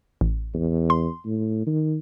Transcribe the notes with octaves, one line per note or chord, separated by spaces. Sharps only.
A1
E2
C6
A2
D#3